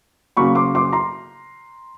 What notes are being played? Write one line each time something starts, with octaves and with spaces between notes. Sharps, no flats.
C#3 F#3 A#3 B5 C#6
C6 D6
C6 D6
A#5 C6